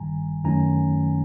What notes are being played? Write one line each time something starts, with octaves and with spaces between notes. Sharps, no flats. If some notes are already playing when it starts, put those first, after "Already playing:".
Already playing: G#1 G2 D#3 G3 G#5 A#5
F#2 D#3 F#3 A3 C#4 G#5 A#5